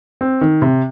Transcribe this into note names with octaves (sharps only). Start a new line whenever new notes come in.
C4
D#3
C3